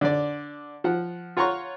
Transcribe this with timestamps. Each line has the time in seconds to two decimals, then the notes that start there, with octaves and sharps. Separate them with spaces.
0.01 D3 D5
0.84 F3 F#5
1.37 F4 C#5 F#5 A#5 C6 C#6